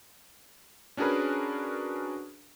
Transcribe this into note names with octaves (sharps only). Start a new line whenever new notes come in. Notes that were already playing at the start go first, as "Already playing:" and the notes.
C#4 D4 F#4 G#4 A#4 B4